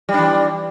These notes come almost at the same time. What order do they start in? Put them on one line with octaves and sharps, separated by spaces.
G3 D4 E3